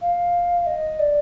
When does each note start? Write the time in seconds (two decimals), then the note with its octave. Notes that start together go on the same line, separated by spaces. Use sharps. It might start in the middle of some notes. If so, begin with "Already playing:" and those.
0.01 F5
0.66 D#5
0.99 D5